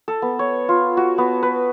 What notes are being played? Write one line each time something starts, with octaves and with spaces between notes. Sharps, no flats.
A4
B3
C#5
F4
F#4
B3
B4